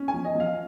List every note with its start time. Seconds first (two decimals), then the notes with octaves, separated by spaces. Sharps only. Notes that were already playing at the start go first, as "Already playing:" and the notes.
Already playing: C#4
0.08 G#5
0.14 F3
0.25 D#5
0.35 F3 F5